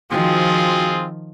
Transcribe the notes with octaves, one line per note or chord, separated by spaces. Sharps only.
D#3 F3 C4 F4 F#4 G#4 G5 C6